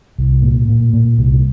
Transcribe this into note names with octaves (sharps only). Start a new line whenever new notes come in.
C2
A#2
A#2
A#2
C2